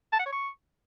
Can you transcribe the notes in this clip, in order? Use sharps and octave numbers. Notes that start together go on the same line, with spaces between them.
A5
F#5
C#5
C#6